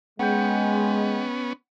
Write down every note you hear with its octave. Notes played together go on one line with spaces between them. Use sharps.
G#3 B3 C#4 F#5 G5 G6